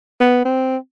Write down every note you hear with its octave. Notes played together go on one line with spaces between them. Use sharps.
B3
C4